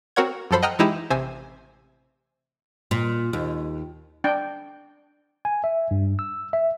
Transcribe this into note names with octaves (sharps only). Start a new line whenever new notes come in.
C4 F#4 A#4 C#5 F#5 G#6
F#2 F3 A4 C5 B5
D#5 F#5 G5 A#5 D#6 F6
E3 G#3 D#4 E4 G4 E6
A1 C3 C5 G#5 E6
A#2
D#2
D4 G5
G#5
E5
G2
E6
E5